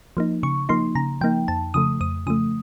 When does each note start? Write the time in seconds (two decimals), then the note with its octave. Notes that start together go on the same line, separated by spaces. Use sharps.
0.17 F3 A#3 D#4
0.43 C#3 C#6
0.69 F3 A#3 D#4 C6
0.95 C#3 A#5
1.21 F3 A#3 D#4 G5
1.48 F2 A5
1.74 C#3 F3 A3 D#6
2.00 F2 D#6
2.27 C#3 F3 A3 D#6